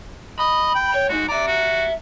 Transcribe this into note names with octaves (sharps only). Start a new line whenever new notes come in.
D#5 B5
G5
C#5
G#3 D#4 F#4
D5 E5 A#5
F#4